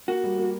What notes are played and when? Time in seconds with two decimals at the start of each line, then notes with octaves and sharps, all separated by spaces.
0.08 A#3 F#4
0.24 G3
0.38 A#3